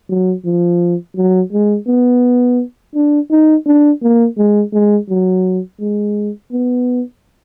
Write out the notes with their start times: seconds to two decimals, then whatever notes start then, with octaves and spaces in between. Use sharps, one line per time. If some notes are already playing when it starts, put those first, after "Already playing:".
0.09 F#3
0.45 F3
1.16 F#3
1.53 G#3
1.88 B3
2.95 D4
3.30 D#4
3.66 D4
4.02 A#3
4.37 G#3
4.73 G#3
5.09 F#3
5.80 G#3
6.52 B3